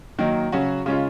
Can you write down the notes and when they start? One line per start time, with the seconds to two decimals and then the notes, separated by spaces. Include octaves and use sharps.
0.19 D#3 F#3 A#3 D#4
0.52 C#3 F#3 C#4 F#4
0.86 C#3 G#3 C#4 F4